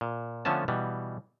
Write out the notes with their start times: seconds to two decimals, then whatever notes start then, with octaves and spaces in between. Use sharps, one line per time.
0.01 A#2
0.45 D3 F3 A3 B3 C#4 A5
0.68 B2 E3 G3